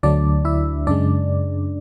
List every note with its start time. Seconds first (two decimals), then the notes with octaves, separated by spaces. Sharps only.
0.03 D2 D3 F#3 A3 D4 D5
0.45 E4 E5
0.87 F#2 C#3 G#3 D4 D5